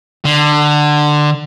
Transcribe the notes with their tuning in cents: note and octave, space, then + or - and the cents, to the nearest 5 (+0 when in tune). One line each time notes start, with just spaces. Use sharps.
D3 +20